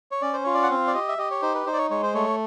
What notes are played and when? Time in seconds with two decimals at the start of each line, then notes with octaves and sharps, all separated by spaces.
0.11 C#5
0.22 C#4 D5
0.33 C5
0.44 F4 C#5
0.54 D5
0.63 F#5
0.70 C4 F5
0.87 D5
0.94 G4 D#5
1.08 E5
1.18 G4 D#5
1.31 C#5
1.42 D#4 C5
1.54 B4
1.67 D#4 C5
1.73 D5
1.78 C#5
1.90 G#3 C#5
2.03 C5
2.14 A3 C#5